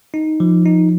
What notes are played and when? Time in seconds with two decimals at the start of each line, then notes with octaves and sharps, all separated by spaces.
0.14 D#4
0.40 F3
0.66 D#4